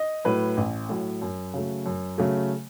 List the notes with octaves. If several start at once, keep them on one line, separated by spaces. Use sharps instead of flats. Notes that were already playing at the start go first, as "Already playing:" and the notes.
Already playing: D#5
A2 F#3 B4
A1
A2 F#3
F#2
C#3 F#3 A3
F#2
C#3 F#3 A3